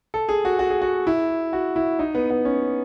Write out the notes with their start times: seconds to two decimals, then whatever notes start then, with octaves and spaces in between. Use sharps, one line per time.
0.14 A4
0.29 G#4
0.45 F#4
0.59 F#4
0.70 G#4
0.82 F#4
1.07 E4
1.53 F#4
1.76 E4
1.99 D#4
2.15 B3
2.30 B3
2.45 C#4